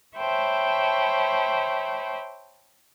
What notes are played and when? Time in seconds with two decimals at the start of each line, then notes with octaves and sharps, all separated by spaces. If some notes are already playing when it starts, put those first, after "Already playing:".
0.17 C5 C#5 E5 G5 A5 B5